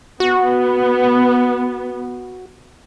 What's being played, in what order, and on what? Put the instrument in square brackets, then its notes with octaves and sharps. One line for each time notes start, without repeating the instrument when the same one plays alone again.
[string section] B3 [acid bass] F#4